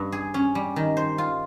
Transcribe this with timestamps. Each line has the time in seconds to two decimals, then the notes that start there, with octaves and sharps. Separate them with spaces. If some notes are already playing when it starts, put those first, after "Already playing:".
Already playing: G2
0.12 G#4
0.34 C#4
0.55 G3
0.76 D#3
0.97 C5
1.18 F4